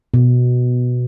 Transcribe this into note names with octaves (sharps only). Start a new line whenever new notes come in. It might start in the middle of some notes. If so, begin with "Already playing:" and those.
B2